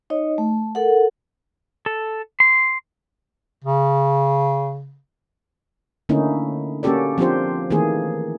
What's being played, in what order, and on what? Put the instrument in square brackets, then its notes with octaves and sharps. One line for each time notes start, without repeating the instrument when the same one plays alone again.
[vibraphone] D#4 C#5 D#5
A3
A4 A#4 F#5
[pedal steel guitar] A4
C6
[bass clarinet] C#3
[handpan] D3 A3 A#3 C#4 D#4 E4
A#3 C#4 F#4 G4 A4 D5
F3 C4 D4 F4 G4 C5
D#3 E3 A3 A#3 G#4